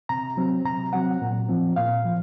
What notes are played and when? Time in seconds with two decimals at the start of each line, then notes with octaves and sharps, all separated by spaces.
0.09 C3 A#5
0.37 F#3 C4
0.65 C3 A#5
0.93 F#3 C4 F#5
1.22 A#2
1.49 F3 C4
1.76 A#2 F5
2.04 F3